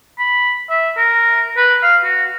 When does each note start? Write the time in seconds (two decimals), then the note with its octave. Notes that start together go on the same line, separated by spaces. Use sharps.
0.18 B5
0.69 E5
0.97 A#4
1.57 B4
1.83 F5
2.04 F#4